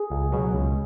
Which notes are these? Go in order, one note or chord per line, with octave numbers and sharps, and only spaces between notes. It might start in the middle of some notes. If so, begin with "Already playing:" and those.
Already playing: G#4
C#2
B2 F#3
C#2